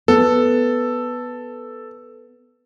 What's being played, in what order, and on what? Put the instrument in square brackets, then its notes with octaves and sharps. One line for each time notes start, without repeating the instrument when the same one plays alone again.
[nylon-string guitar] B3 [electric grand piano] A4